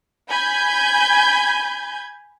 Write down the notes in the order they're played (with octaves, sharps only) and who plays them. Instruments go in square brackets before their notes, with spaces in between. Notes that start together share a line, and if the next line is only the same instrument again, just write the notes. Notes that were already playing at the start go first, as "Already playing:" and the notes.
[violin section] G#5 B5 G6 G#6